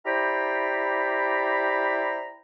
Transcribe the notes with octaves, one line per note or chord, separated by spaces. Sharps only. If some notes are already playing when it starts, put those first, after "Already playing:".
E4 G4 C5 D5 A#5 B5